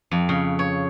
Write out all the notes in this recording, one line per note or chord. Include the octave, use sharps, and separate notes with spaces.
F2
C#3
C#5